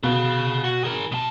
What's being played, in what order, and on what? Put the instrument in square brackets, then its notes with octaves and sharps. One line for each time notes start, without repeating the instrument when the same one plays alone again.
[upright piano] B2 [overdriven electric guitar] G#4 F5
[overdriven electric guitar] F#4
G#4 A#4
B2 A5